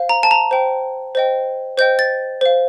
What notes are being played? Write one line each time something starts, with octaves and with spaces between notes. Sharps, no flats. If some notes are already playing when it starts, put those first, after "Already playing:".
Already playing: C5 F5
A#5
A5
A#5
C5 G5
C5 D#5 G5
C5 D#5 G5 G6
A6
C5 F5